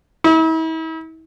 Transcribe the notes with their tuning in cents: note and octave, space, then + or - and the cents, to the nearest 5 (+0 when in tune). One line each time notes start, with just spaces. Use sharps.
E4 -40